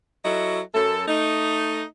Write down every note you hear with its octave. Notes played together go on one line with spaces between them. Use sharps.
F#3 E4 F#4 A4 D#5
F#2 A4
A3 D#4